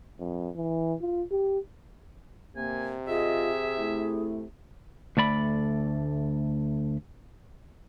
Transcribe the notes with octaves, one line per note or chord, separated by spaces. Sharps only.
F2
E3
F4
G4
C3 A#3 G#5
F4 G#4 D#5 E5
A3 E4
D2 A3 D5 B5